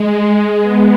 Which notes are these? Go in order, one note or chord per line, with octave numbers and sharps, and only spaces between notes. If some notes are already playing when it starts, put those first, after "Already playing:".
Already playing: G#3
G#3
B3